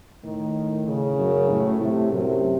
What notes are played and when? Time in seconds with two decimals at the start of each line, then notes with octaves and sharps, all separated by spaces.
0.24 A2 D#3
0.87 C#3
1.18 F#2
1.49 A2
1.80 A2 C3
2.12 F#2 C3